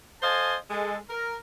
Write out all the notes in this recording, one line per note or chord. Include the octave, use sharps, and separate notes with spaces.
A4 C5 D#5 F5 G#5 A5
G#3 A4
A#4